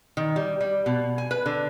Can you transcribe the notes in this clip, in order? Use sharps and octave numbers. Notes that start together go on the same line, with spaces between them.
D#3
G3
G3
B2
G#5
B4
D3